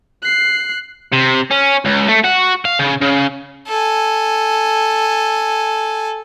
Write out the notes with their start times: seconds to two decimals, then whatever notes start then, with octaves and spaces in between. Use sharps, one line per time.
0.22 F#6 C7
1.12 C3
1.51 C#4
1.85 C#2
2.09 A3
2.24 F#4
2.65 F5
2.79 C#3
3.01 C#3
3.67 A4 G#5